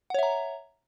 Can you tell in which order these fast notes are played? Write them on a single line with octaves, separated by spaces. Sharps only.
F#5 C#5 E5 A#5